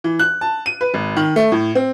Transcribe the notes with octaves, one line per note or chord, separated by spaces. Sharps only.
E3
F#6
A5
D#7
B4
G#1
D#3
A3
A2
C4